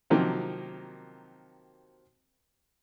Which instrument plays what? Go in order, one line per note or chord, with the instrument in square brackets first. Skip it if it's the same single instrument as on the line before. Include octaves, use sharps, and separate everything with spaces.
[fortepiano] C3 D#3 F3 F#3 A#3 C4